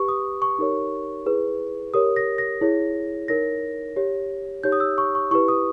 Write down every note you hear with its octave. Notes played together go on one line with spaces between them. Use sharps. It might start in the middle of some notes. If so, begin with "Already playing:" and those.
Already playing: G4 B4 C#6
D#6
C#6
D#4 G4 A#4 C#5
E4 G#4 B4
G4 A#4 C#5 D#6
A#6
A#6
E4 G#4 C#5
D#4 A#4 C#5 A#6
G4 C#5
D#4 G4 C#5 G6
D#6
E6
C#6
C#6
E4 G4 B4 C#6
D#6